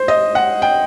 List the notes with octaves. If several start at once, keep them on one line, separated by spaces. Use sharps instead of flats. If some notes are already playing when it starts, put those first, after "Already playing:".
Already playing: C5
D#5
F#5
G5